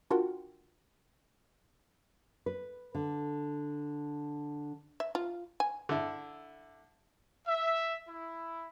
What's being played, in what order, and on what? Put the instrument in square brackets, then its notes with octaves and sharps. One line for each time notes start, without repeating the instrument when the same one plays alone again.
[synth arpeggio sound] D4 F4 F#4 A#4 F#5 G5
[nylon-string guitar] B4
D3
[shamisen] E5
F4
G#5
[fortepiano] D3 E4
[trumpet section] E5
E4